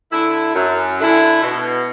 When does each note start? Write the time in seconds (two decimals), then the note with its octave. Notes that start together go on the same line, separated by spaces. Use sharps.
0.12 D3 A3 E4
0.55 F#2
0.99 D3 A3 E4
1.43 B2